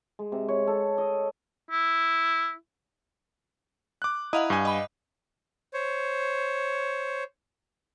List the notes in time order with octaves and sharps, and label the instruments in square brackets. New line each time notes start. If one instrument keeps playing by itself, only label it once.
[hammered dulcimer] G#3
C3
C#5
A4
D#5
[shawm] E4
[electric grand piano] D6 F#6
[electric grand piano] E4 A#5 D#6 [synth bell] D#5 F5 F#5
[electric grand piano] G2 G#5
[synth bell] D#5 B5
[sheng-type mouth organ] C5 C#5